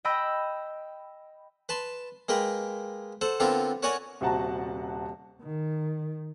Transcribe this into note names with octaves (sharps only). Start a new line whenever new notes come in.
D#5 G5 B5 E6 A#6
B4 A5 C6
G#3 A#3 A#4 B4 G5
A4 C5 F#5
D3 B3 C4 D4 F4 A#4
F#4 A#4 C#5 D5 F#5 G#5
D#1 C3 F#4 F#5 A5 A#5
D#3